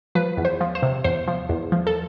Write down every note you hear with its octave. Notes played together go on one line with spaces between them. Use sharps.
F3 B4
E2
C5
F3
C5
C3
E2 C5
F3
E2
F3
A4